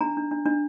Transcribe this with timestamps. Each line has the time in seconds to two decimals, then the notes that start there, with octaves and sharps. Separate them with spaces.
0.01 D4 A#5
0.17 D4
0.31 D4
0.46 D4